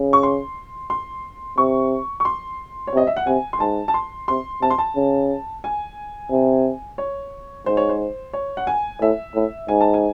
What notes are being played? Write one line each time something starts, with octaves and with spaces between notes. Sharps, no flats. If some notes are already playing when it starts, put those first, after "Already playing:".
Already playing: C#3
C#6
C6
C6
C3 C#6
C#6
C6
C#5
C3 D#5
E5
F#5
C3 G#5
C6
G#2 A5
A5
C6
C3 C6
C3 A5
C6
A5
C#3
G#5
C3
C#5
G#2 C5
C#5
C5
C#5
F#5
G#5
A2 E5
A2
G#2 G#5
A5
G#5